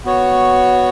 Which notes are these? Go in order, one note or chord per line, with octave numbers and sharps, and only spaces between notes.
B3 F#4 C#5